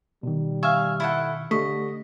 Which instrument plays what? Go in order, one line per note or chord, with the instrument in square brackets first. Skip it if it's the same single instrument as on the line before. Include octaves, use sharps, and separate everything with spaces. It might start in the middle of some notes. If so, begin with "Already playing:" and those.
[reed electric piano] B2 D#3 [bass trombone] G3
[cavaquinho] E5 F5 G#5 [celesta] C#6 F6
[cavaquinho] E4 A4 F#5
[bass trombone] D3 [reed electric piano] A3 [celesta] G4 C#6 B6 [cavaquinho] D#5